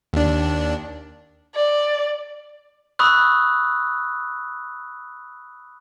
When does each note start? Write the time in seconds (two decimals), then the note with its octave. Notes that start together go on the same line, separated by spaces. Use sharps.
0.13 D#2 D4
1.55 D5
2.99 B5 C#6 D#6 E6 F#6